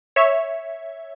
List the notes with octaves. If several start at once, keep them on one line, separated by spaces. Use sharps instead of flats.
C#5 E5